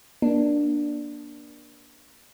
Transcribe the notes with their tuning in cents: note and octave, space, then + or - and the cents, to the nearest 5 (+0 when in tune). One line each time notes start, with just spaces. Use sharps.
A#3 +35 D4 +5